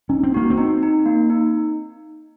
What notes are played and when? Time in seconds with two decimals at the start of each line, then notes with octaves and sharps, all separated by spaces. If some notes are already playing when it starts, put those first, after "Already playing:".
0.09 C#4 D#4
0.23 C4
0.34 A#3 F#4
0.50 C4
0.58 D#4
0.83 D#4
1.06 A#3
1.30 D#4